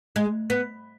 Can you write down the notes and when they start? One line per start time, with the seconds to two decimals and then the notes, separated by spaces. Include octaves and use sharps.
0.16 G#3
0.50 B3